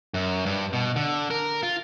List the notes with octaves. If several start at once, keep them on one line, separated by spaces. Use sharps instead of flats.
F#2
G2
B2
D3
A#4
F4